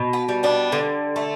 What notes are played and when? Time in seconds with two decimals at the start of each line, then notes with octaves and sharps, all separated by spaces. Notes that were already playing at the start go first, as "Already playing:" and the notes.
Already playing: B2
0.13 B3
0.28 G3
0.43 B3 D4
0.72 D3
1.16 A3